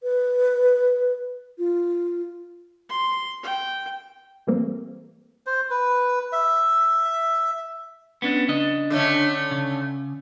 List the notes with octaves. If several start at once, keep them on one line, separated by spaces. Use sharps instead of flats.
B4
F4
C6
G5
A2 E3 G3 A3 A#3 C4
C5
B4
E5
B3 C#4 D4
C#3 D4 D#5
D3 A3 C#4
C#3